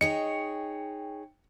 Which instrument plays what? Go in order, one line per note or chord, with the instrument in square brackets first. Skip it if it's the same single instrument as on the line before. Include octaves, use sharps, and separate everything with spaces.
[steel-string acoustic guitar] D#4 G#4 C#5 [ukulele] D#5 [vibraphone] G5 [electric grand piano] C#7